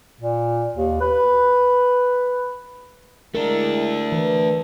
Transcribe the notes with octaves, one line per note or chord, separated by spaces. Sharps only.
A#2
D#2
B4
G#3 A3 D4 E4 A#4
E3 B4